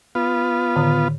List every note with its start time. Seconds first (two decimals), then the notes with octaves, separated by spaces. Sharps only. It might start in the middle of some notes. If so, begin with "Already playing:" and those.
0.15 B3 F4
0.76 A2 D3 D#3